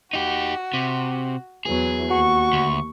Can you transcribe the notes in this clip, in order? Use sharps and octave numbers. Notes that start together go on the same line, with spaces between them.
D#4 F#4 G4
C3
E2 E3 F#3 G#4
D#2 F#4 C#6
D2